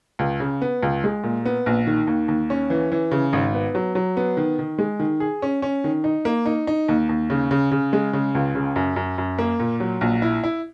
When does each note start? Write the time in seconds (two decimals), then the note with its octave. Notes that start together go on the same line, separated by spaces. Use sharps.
0.19 C#2
0.40 C#3
0.61 B3
0.83 C#2
1.04 G#3
1.24 A#2
1.45 B3
1.66 A#1
1.87 D#3
2.07 D#2
2.28 D#2
2.50 C#4
2.70 E3
2.92 E3
3.11 C#3
3.33 G#1
3.54 B3
3.75 F#3
3.95 F#3
4.17 B3
4.37 D#3
4.59 D#3
4.79 G#3
4.99 D#3
5.20 G#4
5.42 C#4
5.62 C#4
5.84 D#3
6.04 D#4
6.25 A#3
6.46 D#4
6.67 D#4
6.88 D#2
7.09 D#2
7.30 C#3
7.51 C#3
7.71 C#3
7.93 G#3
8.13 C#3
8.35 C#2
8.55 C#3
8.76 F#2
8.96 F#2
9.18 F#2
9.39 A#3
9.60 A#2
9.80 F#3
10.01 A#1
10.22 E4
10.44 E4